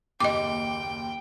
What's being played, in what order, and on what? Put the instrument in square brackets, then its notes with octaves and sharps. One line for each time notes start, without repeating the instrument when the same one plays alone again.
[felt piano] F#1 D#2 [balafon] D#5 D6 [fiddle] G5